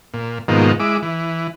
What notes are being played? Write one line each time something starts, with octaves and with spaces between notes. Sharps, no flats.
A#2
G#2 B2 D#3 F3 A#3
G#3 E4 D6
E3